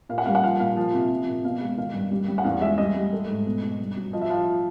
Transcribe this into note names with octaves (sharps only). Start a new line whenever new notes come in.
A#2 F5
F#5
G3 F5
F#5
F3 F5
A#2 F5
F3
C3
F3
A#2
B2 F5
G#3 F5
D#3 F5
G2
G3
G3
F#5
E2 F5
G#3 E5
G3 D#5
G3
A3
G#2
B2
B2
G2
F#3
F3 D#5
E5
F3 F5